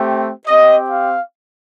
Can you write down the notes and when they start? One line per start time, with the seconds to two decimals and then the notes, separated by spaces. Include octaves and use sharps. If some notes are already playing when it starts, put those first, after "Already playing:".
Already playing: A3 C4 G4
0.47 C4 G4 D#5
0.91 F5